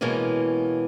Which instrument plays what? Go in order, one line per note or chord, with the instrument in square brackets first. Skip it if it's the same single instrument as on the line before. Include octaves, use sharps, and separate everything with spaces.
[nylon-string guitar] B2 E3 G#3 A#3 C#4